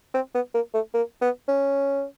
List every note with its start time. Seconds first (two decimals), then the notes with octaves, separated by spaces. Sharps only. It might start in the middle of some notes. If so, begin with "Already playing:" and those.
0.14 C4
0.34 B3
0.54 A#3
0.74 A3
0.94 A#3
1.21 B3
1.48 C#4